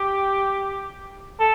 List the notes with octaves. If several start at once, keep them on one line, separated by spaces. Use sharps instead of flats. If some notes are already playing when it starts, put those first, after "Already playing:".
Already playing: G4
A4